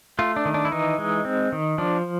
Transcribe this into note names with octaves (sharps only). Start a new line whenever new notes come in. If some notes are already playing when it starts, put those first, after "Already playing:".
A3 F4
D4
D#3
D4
E4
E3 D#4
G#3
C4
D#3
F3 D4